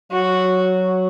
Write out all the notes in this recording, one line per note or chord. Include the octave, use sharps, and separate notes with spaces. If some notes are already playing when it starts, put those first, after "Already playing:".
F#3 F#4